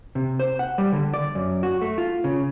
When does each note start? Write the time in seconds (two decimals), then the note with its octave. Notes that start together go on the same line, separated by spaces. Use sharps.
0.15 C3
0.39 C5
0.59 F#5
0.78 G3
0.92 D3
1.13 D5
1.35 F#2
1.63 F#4
1.82 A3
1.98 F4
2.24 C#3